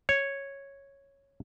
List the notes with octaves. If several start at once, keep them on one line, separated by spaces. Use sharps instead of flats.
C#5